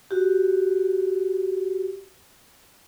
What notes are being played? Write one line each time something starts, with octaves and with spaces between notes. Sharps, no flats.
F#4 G4